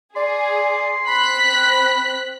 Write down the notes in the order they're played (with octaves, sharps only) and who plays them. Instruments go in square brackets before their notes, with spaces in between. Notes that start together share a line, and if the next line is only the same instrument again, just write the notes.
[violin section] G#4 [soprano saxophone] D5 [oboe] C6
[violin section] C4 F#6 B6 [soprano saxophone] B5